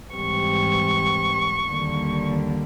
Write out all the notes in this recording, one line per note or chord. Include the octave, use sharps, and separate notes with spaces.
G#2 E3 G3 C4 C#6
D#2 D3 G3 A#3